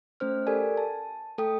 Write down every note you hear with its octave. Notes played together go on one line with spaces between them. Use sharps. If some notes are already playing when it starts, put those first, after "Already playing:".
A3 C#4 C5 F6
G4 A4 A#4 D5 G#5
A5
A3 A4 G5 D#6